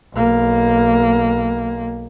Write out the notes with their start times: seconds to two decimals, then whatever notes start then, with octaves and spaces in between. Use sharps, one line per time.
0.13 B1 A#3